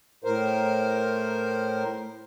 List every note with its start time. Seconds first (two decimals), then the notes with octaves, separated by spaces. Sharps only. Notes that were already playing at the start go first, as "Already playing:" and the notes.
0.24 A2 A#4 C5